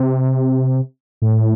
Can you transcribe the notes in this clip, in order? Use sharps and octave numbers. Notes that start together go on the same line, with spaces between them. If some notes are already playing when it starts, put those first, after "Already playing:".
Already playing: C3
A2